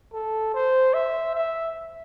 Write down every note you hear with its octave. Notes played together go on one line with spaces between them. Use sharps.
A4
C5
E5
E5